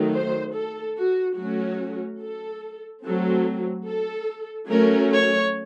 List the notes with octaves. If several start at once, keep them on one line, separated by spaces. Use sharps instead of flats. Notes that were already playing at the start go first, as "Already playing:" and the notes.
Already playing: D#3 F#3 A3
C5
A4
F#4
F#3 A3 C#4 F#4
A4
F#3 A3 C4 A4
A4
F#3 A3 C#4 A#4
C#5